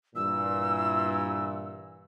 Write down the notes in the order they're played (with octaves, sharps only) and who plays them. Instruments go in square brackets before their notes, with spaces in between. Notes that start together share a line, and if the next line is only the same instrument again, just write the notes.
[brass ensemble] G2 A#2 E3 [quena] E6